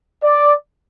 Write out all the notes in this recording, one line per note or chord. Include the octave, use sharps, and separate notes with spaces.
D5